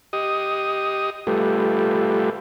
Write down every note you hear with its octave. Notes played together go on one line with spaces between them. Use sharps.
G4 D#5 D#6
G3 A3 F4 G4 A4 B4